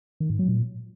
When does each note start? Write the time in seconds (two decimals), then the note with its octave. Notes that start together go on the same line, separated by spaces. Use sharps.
0.20 D#3
0.30 G#2
0.39 F#3
0.48 A#2